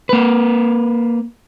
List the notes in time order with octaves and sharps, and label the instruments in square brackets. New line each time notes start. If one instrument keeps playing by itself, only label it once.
[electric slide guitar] A#3 B4